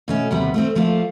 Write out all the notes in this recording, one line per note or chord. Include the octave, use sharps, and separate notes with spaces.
B2 A3 C#4
D#2 C3 G3 B3
A3 B3 C4
F3 A3 A#3 F4